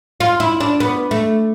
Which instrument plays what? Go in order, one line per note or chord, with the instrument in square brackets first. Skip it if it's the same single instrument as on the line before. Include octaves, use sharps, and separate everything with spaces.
[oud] F4
E4
D4
B3
A3